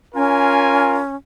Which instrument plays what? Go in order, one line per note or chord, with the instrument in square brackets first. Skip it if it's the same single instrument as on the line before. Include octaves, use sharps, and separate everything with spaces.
[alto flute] C#4 [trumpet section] F4 A#4 G#5